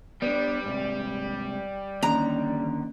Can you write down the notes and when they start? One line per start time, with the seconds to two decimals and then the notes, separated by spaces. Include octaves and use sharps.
0.22 G3 B3 D4 D5
0.65 G#2 C3
2.03 D3 D#3 A#3 C#4 A#5 F#6